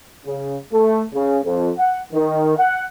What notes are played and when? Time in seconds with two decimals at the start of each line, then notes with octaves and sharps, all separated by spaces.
0.25 C#3
0.72 A3
1.13 C#3
1.43 F2
1.77 F#5
2.13 D#3
2.57 F#5